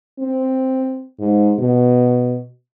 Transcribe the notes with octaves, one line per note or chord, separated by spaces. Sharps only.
C4
G#2
B2